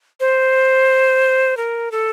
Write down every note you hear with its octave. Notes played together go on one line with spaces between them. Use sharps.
C5
A#4
A4